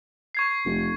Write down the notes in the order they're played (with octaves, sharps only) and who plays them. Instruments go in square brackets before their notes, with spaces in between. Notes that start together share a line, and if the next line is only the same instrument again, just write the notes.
[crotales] C#6 G#6 C7
[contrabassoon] F1